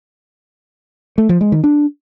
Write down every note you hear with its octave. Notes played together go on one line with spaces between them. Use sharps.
A3
F3
G#3
D#3
D4